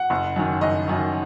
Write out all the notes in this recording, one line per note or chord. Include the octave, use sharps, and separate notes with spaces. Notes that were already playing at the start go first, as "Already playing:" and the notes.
Already playing: F#5
F#1
F#2 D#3
F#1 D#5
F#2 D#3